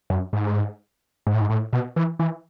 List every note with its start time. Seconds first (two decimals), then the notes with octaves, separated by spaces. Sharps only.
0.10 F#2
0.33 G#2
1.27 G#2
1.34 A2
1.41 G#2
1.50 A2
1.73 B2
1.96 E3
2.19 E3